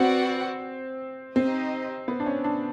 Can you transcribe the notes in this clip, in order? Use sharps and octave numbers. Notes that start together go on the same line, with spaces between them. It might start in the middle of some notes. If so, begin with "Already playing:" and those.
Already playing: C4 F#4 B4 D5 F#5
C4 D#4 G4 C5 D#5
B3
D4
C#4
D4